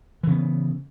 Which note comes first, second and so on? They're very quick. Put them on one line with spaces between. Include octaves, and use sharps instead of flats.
E3 C#3 B3